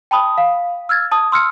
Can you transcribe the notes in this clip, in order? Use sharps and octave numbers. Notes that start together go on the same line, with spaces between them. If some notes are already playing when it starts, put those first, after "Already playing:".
G5 A5 B5 D#6
F5
E6 F6 G#6 A6
A5 D#6
C6 E6 F6 C#7